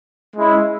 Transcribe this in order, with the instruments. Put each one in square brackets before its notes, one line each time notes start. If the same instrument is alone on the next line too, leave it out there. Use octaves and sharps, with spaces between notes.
[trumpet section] G#3 C#4 E4